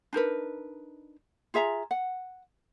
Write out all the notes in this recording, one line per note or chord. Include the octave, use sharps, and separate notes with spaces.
D4 D#4 A#4 B4
F4 G#4 E5 A#5
F#5